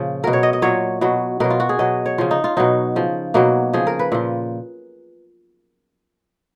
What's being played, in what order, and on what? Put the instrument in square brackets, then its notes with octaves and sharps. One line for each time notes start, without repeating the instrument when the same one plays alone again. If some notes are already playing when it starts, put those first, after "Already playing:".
Already playing: [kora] A#2 C#3 F3
B2 F#3 A#4
C#5
D#5
D#5
A#2 F#3 C#5
B2 F#3
B2 F#3 A#4
F4
F#4
G#4
B2 F#3 D#5
C#5
C#3 F3 F4
D#4
F4
B2 F#3 D#4
C#3 F3
B2 F#3 A#3
C#3 F3 G#4
A#4
B4
A#2 F3